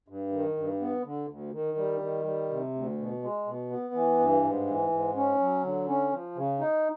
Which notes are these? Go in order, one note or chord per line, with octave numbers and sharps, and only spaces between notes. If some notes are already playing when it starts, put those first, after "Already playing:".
G2
D#3
G2
B3
D3
D2
D#3
G3
D#3
G3
C3
D2
B2
G#3
B2
B3
E3
G2
G#2
E3
G#2
C#4
F#3
D3
C#4
F3
C#3
D#4